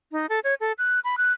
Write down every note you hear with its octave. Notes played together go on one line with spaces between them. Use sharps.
D#4
A4
C#5
A4
F#6
B5
F#6